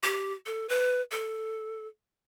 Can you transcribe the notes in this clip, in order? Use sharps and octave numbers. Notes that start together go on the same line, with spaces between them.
G4
A4
B4
A4